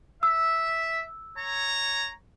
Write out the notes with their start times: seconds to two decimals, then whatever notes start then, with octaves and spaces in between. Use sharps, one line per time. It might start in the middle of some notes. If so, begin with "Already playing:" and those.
0.23 E5 E6
1.38 C#5 A#5